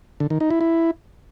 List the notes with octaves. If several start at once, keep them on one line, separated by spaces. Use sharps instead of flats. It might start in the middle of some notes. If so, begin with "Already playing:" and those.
D3
D#3
D#4
E4
E4